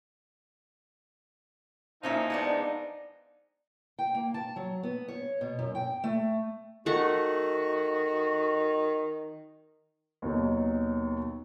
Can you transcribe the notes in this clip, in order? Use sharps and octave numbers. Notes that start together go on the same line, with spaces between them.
A#2 E3 F3 C#4 D#4 E5
G#3 B3 D4
G5
A#3
A5
F#3
B3
C#5
B2
F#2
G5
A3
D#3 A3 F#4 F#5 C#6
D#2 B2 F#3